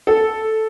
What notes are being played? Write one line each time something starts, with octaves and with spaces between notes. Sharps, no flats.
A4